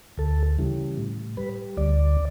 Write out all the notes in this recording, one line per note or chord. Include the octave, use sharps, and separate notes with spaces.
D2 A4
C#3 E3 G3
A2
G3 B4
D2 D5